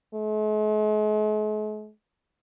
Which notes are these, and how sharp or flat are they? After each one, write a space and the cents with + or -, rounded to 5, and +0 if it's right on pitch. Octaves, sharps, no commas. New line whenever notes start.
G#3 +45